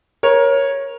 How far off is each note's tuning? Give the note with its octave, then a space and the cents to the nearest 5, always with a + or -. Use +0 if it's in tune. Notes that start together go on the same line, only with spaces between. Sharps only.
A#4 +20 C#5 -10